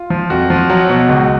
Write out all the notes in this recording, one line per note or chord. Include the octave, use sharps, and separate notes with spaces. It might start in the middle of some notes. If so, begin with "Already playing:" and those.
Already playing: F4
F3
F2 F#4
F3
F#3 F#4
B2
C#2